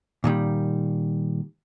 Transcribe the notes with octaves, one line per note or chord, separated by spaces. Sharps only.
A#2 D#3 G3